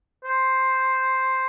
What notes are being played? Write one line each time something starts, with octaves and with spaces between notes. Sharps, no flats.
C5